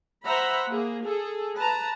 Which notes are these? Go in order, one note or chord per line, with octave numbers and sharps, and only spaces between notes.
C5 E5 F#5 A#5 B5
A#3 G#4
G#4 A4
B4 A5 A#5